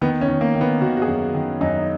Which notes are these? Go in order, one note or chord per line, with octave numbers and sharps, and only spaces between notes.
D#3 B3
C#4
D#3
A#3
D#3
B3
D#3 F#4
F#4
G#4
F#2
D#3
F#2 D#4